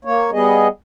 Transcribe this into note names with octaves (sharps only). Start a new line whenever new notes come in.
A#3 C#5
G3 B3 G#4 D#5